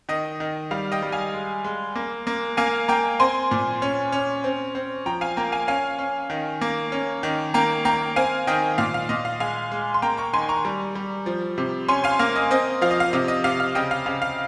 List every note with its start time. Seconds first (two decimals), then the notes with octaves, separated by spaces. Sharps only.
0.09 D#3 D#5
0.40 D#3
0.71 G3 F5
0.92 D#5 G5
1.02 G3
1.12 F5 G#5
1.34 G#3
1.64 G#3
1.95 A#3
2.27 A#3
2.57 A#3 F5 G#5
2.88 A#3 G5 A#5
3.20 C4 G#5 C6
3.51 A#2
3.82 C#4
4.12 C#4
4.44 C4
4.75 C4
5.06 F3 G5 A#5
5.21 F5 G#5
5.37 A#3 G5 A#5
5.52 F5 G#5
5.68 C#4 F5 G#5
5.99 C#4
6.30 D#3
6.61 A#3
6.92 C#4
7.23 D#3
7.54 A#3 G5 A#5
7.85 A#3 G5 A#5
8.16 C4 F5 G#5
8.47 D#3 D#5 G5
8.78 A#2 F5
8.94 F5
9.09 A#2 D#5
9.25 F5
9.40 G#3 F5 G#5
9.71 G#3
9.94 C6
10.02 A#3 G5 A#5
10.17 A#5 C#6
10.33 D#3 G#5 C6
10.49 A#5 C#6
10.65 G3
10.95 G3
11.26 F3
11.58 C3
11.88 C#4 G#5 C6
12.04 F5 G#5
12.19 A#3 F5
12.36 D#5
12.51 C4 D#5
12.81 F3 F5
12.91 D#5
13.00 F5
13.13 C3 D#5
13.28 D#5
13.44 C3 F5
13.60 F5
13.75 C#3 D#5 G5
13.91 F5
14.06 C#3 F5
14.22 F5